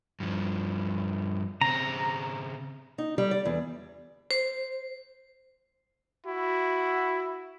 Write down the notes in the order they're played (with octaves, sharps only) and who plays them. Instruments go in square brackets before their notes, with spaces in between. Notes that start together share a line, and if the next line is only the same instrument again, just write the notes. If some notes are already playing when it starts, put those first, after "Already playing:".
[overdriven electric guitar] G2 F3
[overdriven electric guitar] C#3 C4 [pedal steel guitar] A#5
[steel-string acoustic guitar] D#4
G3
D5
E2
[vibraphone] C5
[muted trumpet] E4 [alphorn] F#4